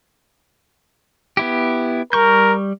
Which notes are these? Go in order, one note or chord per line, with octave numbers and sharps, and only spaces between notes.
B3 E4 G4
G3 A#4 C#6 G6